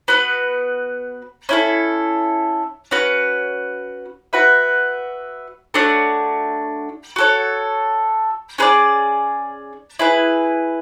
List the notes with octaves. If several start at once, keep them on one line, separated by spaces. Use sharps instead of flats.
B3 F#4 B4
C#4 E4 A4
C#4 F#4 B4
F#4 B4 E5
A3 D4 F#4 C#5
F#4 A4 C#5
C#4 G#4 B4 D5
E4 G#4 B4